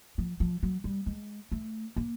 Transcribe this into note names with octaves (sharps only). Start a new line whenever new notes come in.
F3
F3
F#3
G3
G#3
A3
A#3